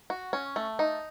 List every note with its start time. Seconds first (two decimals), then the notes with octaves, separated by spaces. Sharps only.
0.10 F#4
0.33 C#4
0.56 A3
0.79 D#4